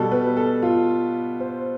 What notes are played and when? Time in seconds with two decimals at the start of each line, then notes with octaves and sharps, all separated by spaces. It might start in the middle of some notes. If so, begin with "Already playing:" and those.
Already playing: B2 G3 A4
0.11 B4
0.37 A4
0.63 F4
1.40 C5